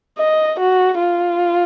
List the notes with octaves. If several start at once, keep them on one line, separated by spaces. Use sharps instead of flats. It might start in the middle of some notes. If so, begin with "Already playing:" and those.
D#5
F#4
F4